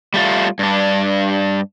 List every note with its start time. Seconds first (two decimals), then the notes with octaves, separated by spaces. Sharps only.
0.14 G3 A3 F4
0.59 G2 D4